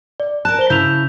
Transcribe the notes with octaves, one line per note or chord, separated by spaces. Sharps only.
D5
A#4 A5 F#6
C5 G7
C#3 E4 G6 F7